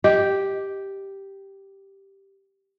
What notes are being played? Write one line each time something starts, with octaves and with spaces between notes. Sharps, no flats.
G4 D#5